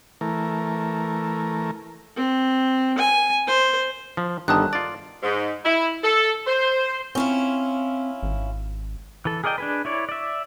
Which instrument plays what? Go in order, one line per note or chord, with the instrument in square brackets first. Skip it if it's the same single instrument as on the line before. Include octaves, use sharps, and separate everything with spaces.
[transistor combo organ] E3 A3 A#4
[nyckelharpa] C4
G#5
C5
[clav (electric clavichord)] F3
[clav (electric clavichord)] G1 D3 D#3 [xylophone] A5 D#6 F#6
[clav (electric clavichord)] F4 D5 [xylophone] A6
[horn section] G#2
E4
A4
C5
[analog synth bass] C4 [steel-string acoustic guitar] C#4 E4 F4
[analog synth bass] G#1
[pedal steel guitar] E3 A4
G#4 A#4 D5 D#5 G5
D4 G#4 B4
E4 C#5 D5
D5 E5